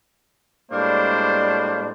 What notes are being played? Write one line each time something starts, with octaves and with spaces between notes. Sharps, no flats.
A2 G3 G#3 A#3 D4 C5